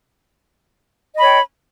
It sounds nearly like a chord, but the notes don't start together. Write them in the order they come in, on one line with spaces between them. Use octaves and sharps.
D#5 B5 C#5 G5